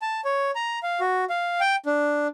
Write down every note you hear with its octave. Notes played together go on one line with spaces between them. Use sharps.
A5
C#5
A#5
F5
F#4
F5
G5
D4